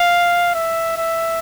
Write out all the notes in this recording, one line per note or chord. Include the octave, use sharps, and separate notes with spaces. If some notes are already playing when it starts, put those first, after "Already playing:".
Already playing: F5
E5
E5